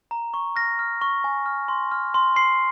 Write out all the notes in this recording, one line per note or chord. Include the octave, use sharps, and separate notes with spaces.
A#5
C#6
F6 A#6
F6
C#6
G#5
F6
C6
F6
C6
C6 C7